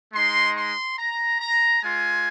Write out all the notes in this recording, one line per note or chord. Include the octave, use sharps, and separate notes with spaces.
G#3 D#4 C6
C6
A#5
A#5
G#3 F4 G#5